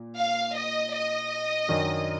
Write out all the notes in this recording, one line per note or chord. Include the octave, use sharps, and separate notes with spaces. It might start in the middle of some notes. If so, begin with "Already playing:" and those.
Already playing: A#2
F5
D#5
D#5
F#2 D#3 F#3 D4